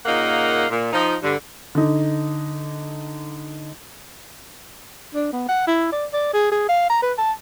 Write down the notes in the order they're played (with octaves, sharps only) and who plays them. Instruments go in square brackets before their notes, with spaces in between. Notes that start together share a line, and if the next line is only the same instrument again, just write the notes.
[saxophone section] A#2 C#3 A#3 D#4 F5 F#5
A#2
F3 D#4
G2 D3
[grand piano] D3 D#4
[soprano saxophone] D4
B3
F#5
E4
D5
D5
G#4
G#4
F5
A#5
B4
A5